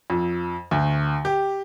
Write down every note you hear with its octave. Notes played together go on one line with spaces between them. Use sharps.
F2
D2
G4